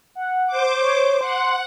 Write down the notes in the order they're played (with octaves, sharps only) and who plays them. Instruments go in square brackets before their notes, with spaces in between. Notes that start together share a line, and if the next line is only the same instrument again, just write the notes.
[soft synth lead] F#5
[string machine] C5 D6
[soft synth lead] C#5
[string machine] F#5 [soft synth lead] C6